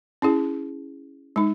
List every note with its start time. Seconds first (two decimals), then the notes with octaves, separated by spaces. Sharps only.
0.22 C#4 E4 G#4
1.36 G#3 D#4